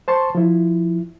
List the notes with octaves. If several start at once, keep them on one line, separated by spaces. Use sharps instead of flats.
C5 A5 C6 C#6
F3 E4